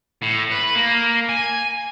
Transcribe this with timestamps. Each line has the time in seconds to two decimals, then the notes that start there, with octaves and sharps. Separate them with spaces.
0.22 A2
0.50 B4
0.75 A#3
1.29 G#5